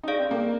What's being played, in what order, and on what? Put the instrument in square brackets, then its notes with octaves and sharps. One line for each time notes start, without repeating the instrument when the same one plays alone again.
[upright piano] D#4
[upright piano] D4 [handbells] G#4 D5 F5
[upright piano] C4
A#3